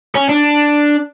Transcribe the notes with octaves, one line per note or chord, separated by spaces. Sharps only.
C#4
D4